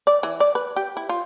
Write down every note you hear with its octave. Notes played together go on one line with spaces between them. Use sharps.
D5
E3
D5
B4
G4
E4
F4